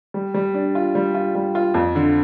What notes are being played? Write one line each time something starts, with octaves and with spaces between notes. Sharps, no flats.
G3
G3
D4
F4
G3
F4
G3
F4
F2
D3